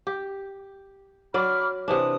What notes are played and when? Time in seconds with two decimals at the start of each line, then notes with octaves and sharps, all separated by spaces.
0.07 G4
1.34 F#3 D5 B5 D6 F6
1.88 C3 E3 D4 D#6